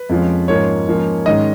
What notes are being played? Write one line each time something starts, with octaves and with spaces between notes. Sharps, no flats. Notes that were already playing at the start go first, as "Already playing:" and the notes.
Already playing: B4
F2 F3 G#3 C#4
G#2 F3 A#3 C#4 C#5
G#2 F3 A#3 C#4
G#2 D#3 G#3 C#4 D#5